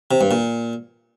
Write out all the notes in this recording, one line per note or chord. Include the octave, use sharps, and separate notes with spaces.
C3
G2
A#2